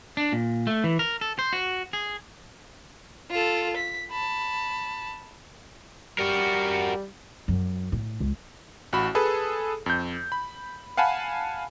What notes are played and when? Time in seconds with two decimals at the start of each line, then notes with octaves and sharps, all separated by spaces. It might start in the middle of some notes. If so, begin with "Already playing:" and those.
0.17 D4
0.32 A#2
0.67 A3
0.84 E3
0.99 A#4
1.21 A4
1.39 C5
1.53 F#4
1.93 G#4
3.31 F4 A4
3.76 B6
4.11 A5 B5
6.19 G3 F#4 A#4
7.48 F#2
7.92 A2
8.20 C#2
8.93 A1 F#4 B5
9.15 G#4 A4 B4
9.86 F2 G6
10.32 B5
10.97 F5 F#5 G#5 A5 B5